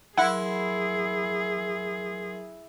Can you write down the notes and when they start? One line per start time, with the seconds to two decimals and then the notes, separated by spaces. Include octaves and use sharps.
0.18 F#3 E4 G#4 A#4 F#5 C6